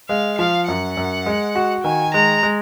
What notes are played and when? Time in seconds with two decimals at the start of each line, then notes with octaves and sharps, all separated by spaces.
0.09 G#3 F5
0.38 F3 F5
0.67 F#2 F#5
0.97 F#2
1.26 G#3
1.55 F#4
1.84 D#3 G#5
2.14 G#3 A#5
2.43 G#3